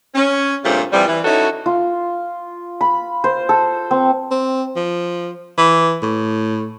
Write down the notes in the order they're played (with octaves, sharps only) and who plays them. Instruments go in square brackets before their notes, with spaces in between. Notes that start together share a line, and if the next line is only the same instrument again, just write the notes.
[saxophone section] C#4
G2 A#2 C#3 A3 C4 F4
C3 E3 F3 G3
E3
C#4 D#4 E4 F#4 A4 C#5
[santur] F4
B5
C5
A4
C4
[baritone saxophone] C4
F3
E3
A2